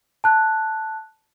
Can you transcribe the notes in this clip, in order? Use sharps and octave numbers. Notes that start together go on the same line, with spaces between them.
A5 F#6